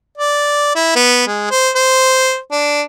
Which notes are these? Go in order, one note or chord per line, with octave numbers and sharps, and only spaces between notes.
D5
E4
B3
G#3
C5
C5
D4